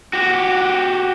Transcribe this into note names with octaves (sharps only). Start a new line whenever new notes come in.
F#4 G4